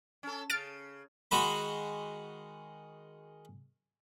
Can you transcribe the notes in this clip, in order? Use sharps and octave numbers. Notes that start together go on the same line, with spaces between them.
C#4 A4
C#3 F6 A6 D7
D#3 G#3 F#4 B5